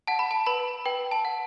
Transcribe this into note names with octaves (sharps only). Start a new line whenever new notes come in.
F#5 A5
B5
A5
B4 B5
B4 G5
A5
F#5